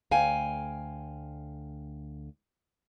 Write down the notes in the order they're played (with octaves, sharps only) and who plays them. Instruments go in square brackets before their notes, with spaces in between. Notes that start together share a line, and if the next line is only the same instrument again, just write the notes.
[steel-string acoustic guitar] D2 F5 G5 G#5